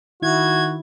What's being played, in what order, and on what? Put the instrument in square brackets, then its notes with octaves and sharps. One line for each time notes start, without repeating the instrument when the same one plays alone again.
[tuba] D#3 [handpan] E4 [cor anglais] F#4 [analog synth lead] G#6